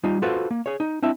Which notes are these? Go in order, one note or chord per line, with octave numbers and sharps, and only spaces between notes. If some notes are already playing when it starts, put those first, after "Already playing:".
G3 D#4 F4
F4 F#4 A4 B4 C5 F5
A#3
G#4 C#5
D#4
C4 D4 E4 E5